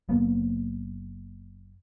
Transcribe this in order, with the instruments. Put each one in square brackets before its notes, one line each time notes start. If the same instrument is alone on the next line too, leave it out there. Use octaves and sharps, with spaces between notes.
[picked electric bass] F#1 A#3 B3